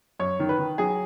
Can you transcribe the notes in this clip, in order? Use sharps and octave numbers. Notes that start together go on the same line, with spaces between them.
F#2 C#5
D#3
B4
D#3
F#3 G#4